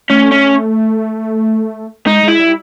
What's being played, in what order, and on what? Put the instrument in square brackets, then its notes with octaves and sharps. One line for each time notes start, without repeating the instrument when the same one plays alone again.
[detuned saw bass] A3 [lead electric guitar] C#4
[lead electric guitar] C#4
[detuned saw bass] G#3 [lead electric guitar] D#4
[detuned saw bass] G#3 [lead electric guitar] E4
[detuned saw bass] G3